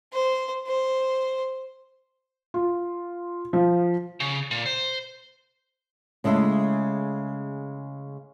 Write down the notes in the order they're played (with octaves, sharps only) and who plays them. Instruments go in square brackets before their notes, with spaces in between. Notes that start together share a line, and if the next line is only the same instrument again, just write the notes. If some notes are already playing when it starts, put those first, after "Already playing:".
[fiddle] C5
C5
[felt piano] F4
F3
[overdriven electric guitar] C#3
A#2
C5
[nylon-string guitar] C#3 G#3 A3 E4